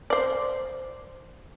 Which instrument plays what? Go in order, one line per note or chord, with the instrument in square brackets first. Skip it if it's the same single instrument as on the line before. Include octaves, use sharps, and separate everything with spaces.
[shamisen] C5 D5